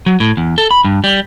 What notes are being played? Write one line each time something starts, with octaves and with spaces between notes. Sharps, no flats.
F#3
A2
E2
A4
B5
G2
G3